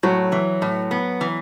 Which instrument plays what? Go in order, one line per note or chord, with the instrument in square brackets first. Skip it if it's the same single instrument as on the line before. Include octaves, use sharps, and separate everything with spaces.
[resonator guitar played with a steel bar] A2 [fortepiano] F#3
[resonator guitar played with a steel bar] E3
A2
B3
E3